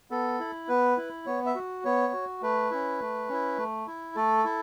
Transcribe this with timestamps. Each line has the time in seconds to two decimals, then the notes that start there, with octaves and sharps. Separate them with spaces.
0.11 B3 A4
0.40 E4
0.68 B3 B4
0.97 E4
1.26 B3 C#5
1.46 E5
1.55 F#4
1.84 B3 C#5
2.13 F#4
2.42 A3 B4
2.71 C#4 E4
3.00 A3
3.29 C#4 E4
3.58 A3
3.87 E4
4.15 A3 A4
4.44 E4